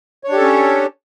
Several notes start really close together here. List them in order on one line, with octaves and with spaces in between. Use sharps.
C#5 D4 G4 A4 C#4